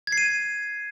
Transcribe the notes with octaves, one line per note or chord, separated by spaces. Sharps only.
G#6
C7
D#7